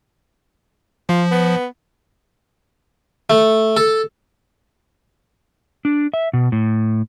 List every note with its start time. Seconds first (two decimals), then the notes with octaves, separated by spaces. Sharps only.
1.09 F3 F4
1.31 B3
3.30 A3
3.77 A4
5.85 D4
6.14 E5
6.33 B2
6.52 A2